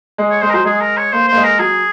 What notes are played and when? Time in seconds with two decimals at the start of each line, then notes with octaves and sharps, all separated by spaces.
0.18 G#3
0.31 C#5
0.42 G#3 C5
0.49 A#4
0.54 F#3 C5
0.65 G#3 G#4
0.81 A#4
0.97 C#5
1.13 A#3 C5
1.28 A#3 C5
1.37 G#3
1.44 A#4
1.59 F#3 G#4